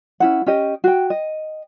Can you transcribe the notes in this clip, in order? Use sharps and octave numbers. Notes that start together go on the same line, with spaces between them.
C#4 E4 F#5
C#4 G4 D#5
F#4 G5
D#5